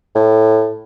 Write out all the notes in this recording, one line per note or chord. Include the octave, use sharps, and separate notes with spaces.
A2